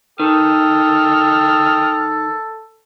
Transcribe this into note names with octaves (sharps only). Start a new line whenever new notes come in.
D#3 A4 G5 D#6 F6